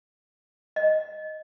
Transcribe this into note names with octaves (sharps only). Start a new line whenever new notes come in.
D#5